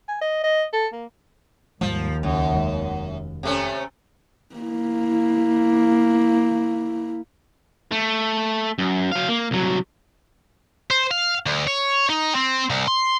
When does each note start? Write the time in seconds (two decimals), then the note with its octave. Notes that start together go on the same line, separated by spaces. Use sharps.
0.09 G#5
0.21 D#5
0.44 D#5
0.73 A4
0.93 A#3
1.81 D#2 G#2 F3 G3 G#3
2.23 C#2 F#2
2.53 F1 D#3 G#3
3.43 C3 A3 C#4
4.56 A#3 E4
7.92 A3
8.79 F#2
9.12 F#3 F5
9.29 A#3
9.51 C2 F#3
10.91 C5
11.11 F5
11.46 D2
11.67 C#5
12.10 D#4
12.35 C4
12.70 C2
12.88 C6